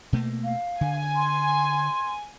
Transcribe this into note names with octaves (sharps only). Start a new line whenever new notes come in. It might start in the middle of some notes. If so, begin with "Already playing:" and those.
B2 A3 A#3
F5
D3 G#5
C6